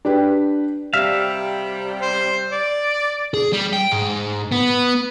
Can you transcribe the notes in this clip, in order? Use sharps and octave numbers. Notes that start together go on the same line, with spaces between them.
D4 G4 B4
C3 G3 E5 F5
C5
D5
G#4
G3
G5
G#2
B3